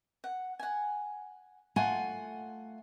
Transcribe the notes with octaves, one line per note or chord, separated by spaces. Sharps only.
F#5
F#5 G#5
A3 F4 F#5 G#5 C6